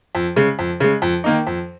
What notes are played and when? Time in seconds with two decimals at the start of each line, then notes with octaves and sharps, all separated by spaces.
0.15 F2
0.36 C#3 G#3
0.59 F2
0.80 C#3 G#3
1.02 F2
1.24 D#3 A#3 D#4
1.47 F2